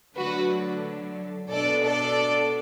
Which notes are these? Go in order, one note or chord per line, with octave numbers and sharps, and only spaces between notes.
D3 F#3 A3 D4 F#4 B4
B2 B3 D4 A4 D5
A4 D5